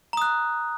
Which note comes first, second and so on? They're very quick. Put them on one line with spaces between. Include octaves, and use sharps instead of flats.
A#5 D#6 F#6